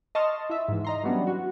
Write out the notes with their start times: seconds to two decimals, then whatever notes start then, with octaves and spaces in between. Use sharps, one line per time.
0.15 D#5 A5 C6 C#6 F6
0.50 E4 E5
0.68 G#2 E3
0.85 D#5 A#5 C6
1.04 E3 F#3 G3 B3 C#4 D4
1.27 F#4